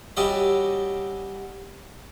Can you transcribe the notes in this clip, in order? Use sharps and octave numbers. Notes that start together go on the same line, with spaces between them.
G3 C#4 F#4 G4 D#5 E5